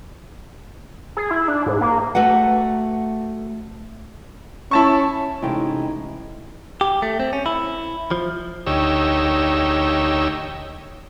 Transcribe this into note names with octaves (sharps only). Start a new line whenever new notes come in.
G#4
E4
D4
G#2
A#3
A3 F#4 B4 F#5
C#4 E4 A5 C#6
A1 C3 G#3 D#4 E4 G5
G4
A3
C4
C#4
E4
F3
D2 D#4 G4 C#5 E6